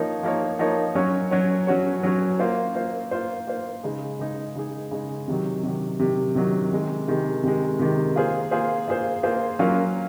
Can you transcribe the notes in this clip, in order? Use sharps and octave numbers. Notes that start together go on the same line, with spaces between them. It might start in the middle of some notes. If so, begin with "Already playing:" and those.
Already playing: F3 A#3 D#4 A#4 C#5
F3 A#3 D#4 A#4 C#5
F3 A#3 D#4 A#4 C#5
F#3 C#4 F#4 C#5
F#3 C#4 F#4 C#5
F#3 C#4 F#4 C#5
F#3 C#4 F#4 C#5
A#3 F4 C5
A#3 F4 C5
A#3 F4 C5
A#3 F4 C5
C#3 G#3 D#4 G#4
C#3 G#3 D#4 G#4
C#3 G#3 D#4 G#4
C#3 G#3 D#4 G#4
C3 D#3 F#3
C3 D#3 F#3
C3 D#3 F#3
C3 D#3 F#3
C3 D#3 G#3
C3 D#3 G#3
C3 D#3 G#3
C3 D#3 G#3
A#3 F4 G#4 C5
A#3 F4 G#4 C5
A#3 F4 G#4 C5
A#3 F4 G#4 C5
F#3 A#3 C#4 F4